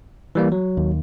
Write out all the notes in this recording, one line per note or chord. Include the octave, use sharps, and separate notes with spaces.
E3 G3 A#3
F#3
D#2